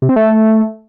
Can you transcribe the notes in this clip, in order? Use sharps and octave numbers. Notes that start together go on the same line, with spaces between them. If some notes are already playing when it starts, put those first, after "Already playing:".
C3
C4
A3